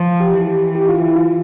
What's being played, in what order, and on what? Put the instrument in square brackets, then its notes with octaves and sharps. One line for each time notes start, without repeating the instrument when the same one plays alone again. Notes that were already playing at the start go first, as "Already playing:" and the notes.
Already playing: [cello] F3
[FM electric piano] G4
[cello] E3
[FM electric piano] G4
G4
F4
E4
F4